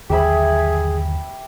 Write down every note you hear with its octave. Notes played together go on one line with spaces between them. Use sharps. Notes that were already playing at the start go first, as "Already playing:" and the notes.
G1 D#2 F#3 G4 G#4 E5 B5